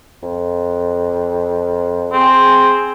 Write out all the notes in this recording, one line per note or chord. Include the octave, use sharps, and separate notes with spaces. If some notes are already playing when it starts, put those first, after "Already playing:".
F2
C4 G#4